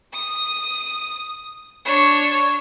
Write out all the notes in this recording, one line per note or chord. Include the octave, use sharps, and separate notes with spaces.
D#6
D4 C#5